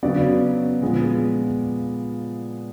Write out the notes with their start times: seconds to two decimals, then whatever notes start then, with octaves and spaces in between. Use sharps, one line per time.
0.03 C#3 F#3 B3 D5
0.81 A#2 F3 G#3 B3